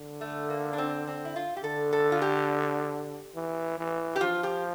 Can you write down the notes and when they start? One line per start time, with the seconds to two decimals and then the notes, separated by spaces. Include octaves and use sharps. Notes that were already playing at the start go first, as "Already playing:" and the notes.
Already playing: D3
0.21 A3
0.50 A#3
0.73 D4
0.78 C4
1.07 C4
1.25 E4
1.36 F4
1.57 G4
1.64 D3 A4
1.93 A4
2.12 F4
2.22 G4
3.35 E3
3.78 E3
4.16 G4
4.21 F3 F4
4.43 G4